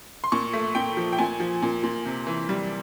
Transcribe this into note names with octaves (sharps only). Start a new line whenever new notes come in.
C6
A#2 C#6
A3
A#2 G5
F3
G5
A#2 G#5
F3
A#2
A#2
C3
E3
G3